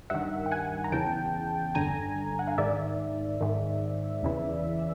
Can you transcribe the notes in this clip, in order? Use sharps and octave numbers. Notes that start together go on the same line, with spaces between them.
G2 D#3 E5 F#5
G5
F#5 G#5
A#5
E2 C#3 E3 G5 A5
G2 D3 G#5 A#5
F#5
F5
G#2 D#3 D5 E5
G#2 D#3
E2 C#3 E3